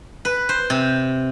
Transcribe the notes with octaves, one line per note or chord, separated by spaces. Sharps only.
B4
C5
C3